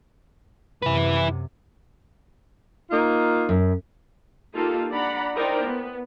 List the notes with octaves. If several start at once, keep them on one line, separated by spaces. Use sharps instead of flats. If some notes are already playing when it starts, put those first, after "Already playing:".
F#2 C3 E4 B4
A#3 D#4 F4
F#2
A#3 D#4 F4 G4 A4
D4 D5 F#5 A#5 B5
D#4 E4 A#4 C5 D5 G5
B3